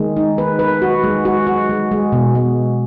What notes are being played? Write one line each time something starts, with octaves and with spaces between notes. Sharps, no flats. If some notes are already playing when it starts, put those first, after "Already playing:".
Already playing: D#3 G#3
D#4
B4
B4
F#4
G#3
F#4
F#4
G#3
G#3
B2
G#3